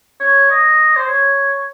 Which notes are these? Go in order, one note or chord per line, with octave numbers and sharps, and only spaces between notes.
C#5
D#5
C5
C#5